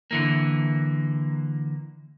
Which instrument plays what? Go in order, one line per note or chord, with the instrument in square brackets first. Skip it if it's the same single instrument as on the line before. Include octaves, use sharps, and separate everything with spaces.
[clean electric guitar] D3 E3 A#3